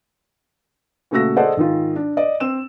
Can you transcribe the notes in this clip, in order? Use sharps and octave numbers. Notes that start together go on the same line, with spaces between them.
A#2 C#3 A3 F#4 E6 A#6
G#4 A4 C5 D5 D#5 F#5
G#2 D#3 F4
D4
D5 D#5
C4 E6 E7